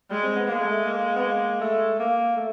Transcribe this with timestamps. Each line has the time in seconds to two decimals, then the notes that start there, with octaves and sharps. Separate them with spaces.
0.10 G3 G#3
0.23 C4
0.36 B3
0.48 G#3 A#3
0.61 A3
0.85 A#3
1.16 B3
1.23 A#3
1.61 A3
1.99 A#3
2.37 A3